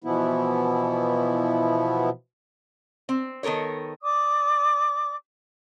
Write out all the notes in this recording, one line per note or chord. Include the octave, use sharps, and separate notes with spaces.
B2 E3 F3 B3 E4
C4
D#3 B3 A4 A#4 C#5
D5 D6 D#6